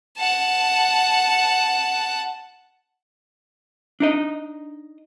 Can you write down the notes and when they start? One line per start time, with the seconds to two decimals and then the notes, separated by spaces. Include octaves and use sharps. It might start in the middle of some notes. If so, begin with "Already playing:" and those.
0.18 F#5 A5
4.00 D4 D#4 D#5